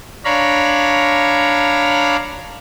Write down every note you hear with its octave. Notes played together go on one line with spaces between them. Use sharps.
D4 C#5 F5 A#5 B5